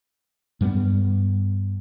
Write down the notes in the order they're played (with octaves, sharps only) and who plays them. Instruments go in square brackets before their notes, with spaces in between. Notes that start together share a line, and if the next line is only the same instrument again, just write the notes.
[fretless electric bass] G2 G3 A3 B3